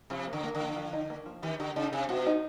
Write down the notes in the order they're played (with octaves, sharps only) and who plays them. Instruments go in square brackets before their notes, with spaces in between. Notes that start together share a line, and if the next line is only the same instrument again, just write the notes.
[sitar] C3 [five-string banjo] F3
[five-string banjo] A#3
[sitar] D3
[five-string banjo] A#3
[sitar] D3
[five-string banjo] F3
F3
D#4
A#3
F3
[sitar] D#3 [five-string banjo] G4
[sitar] D3 [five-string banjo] G4
[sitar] C#3 [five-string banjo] D#4
[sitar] C3 [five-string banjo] G4
[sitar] B2 [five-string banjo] F#4
[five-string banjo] D#4